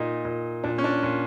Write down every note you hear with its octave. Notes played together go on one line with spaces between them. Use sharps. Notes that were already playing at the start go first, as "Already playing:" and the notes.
Already playing: A#2 D#4
A#2
A#2 D4
C#4
D4
A#2